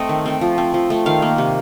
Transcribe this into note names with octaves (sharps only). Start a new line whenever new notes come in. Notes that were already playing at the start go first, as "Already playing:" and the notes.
Already playing: A3 C4 D#5
D#3
A3 C4
F3
C4
F3
A3 C4
D#3 F5
A#3
C3